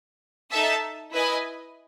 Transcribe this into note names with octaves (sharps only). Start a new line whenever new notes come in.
D#4 A4 E5 A5
E4 B4 D#5 G#5